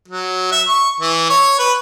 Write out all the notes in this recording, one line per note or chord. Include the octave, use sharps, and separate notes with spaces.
F#3
E5
C#6
E3
C#5
B4